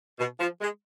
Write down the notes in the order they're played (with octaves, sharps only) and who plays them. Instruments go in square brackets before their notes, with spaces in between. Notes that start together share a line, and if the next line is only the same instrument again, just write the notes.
[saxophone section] B2
F3
G#3